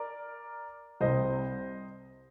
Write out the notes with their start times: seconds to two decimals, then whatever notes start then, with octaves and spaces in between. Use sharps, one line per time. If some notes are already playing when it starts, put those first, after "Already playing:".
Already playing: A#4 D5
1.01 C2 C3 G3 C4 C5 D#5